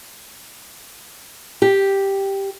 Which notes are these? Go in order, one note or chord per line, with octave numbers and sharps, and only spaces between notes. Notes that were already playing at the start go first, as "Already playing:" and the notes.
G4